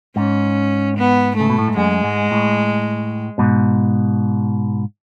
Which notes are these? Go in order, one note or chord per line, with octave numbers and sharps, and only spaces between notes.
G#2 C#4
B3
C#3 A3
B2
A2
G#2
F#2 G#3
G#2
A2
G#2 B2